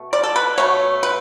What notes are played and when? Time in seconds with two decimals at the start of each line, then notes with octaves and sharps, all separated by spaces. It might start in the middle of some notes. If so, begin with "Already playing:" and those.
Already playing: B2 A3
0.13 D5
0.23 A4
0.36 B4
0.58 B2 A3 C#5
1.03 B4